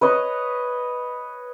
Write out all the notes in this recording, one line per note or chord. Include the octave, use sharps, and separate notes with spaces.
B4 C#5 D#5